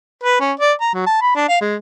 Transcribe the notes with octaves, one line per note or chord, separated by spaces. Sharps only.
B4
C#4
D5
A#5
F#3
A5
B5
D4
F5
G#3